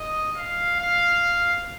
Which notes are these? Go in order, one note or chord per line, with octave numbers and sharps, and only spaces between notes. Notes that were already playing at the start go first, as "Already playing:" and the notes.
Already playing: D#5
F5
F5